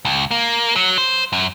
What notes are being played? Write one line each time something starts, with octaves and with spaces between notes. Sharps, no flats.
C#2
A#3
F#3
C5
F#2